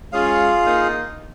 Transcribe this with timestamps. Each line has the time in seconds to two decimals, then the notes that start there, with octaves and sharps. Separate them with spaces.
0.12 G#3 C#4 F4 G#4 F5
0.66 A#3 D#4